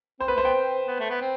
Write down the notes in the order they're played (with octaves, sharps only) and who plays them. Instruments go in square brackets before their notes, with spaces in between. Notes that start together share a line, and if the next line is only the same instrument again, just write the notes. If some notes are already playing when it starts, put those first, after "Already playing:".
[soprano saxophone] C4 [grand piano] C5
[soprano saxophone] B3 [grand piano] B4
[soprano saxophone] A3
[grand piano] C5
[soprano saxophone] B3 [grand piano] G5
[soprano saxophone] C4
B3
A3
B3
C4